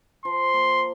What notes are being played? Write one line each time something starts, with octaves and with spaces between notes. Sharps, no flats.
F3 C6
A#3